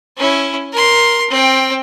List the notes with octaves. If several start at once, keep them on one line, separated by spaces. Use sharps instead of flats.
C#4 E4
A#4 C6
C4 G5